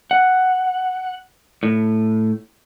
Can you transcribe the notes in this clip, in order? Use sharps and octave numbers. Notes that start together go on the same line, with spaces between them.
F#5
A2